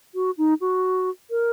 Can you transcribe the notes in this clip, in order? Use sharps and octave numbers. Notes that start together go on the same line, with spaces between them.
F#4
D#4
F#4
A#4